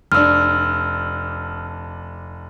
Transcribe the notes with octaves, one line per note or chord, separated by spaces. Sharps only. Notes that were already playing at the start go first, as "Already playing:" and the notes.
F1 D4 E6 F6